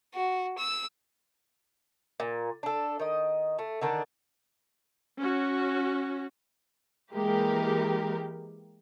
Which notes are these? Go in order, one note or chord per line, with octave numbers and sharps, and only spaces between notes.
F#4
E6
A#2
D4 A4
D#3 D#5
A3
D3 D#3 D4
C#4 F#4
E3 G#3 A#3 G4 A#4